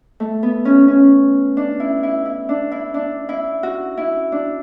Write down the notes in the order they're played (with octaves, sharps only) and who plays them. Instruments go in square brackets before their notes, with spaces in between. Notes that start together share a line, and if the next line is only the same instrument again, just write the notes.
[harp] A3
B3
C#4
C#4
D4
E4
E4
E4
D4
E4
D4
E4
F#4
E4
D4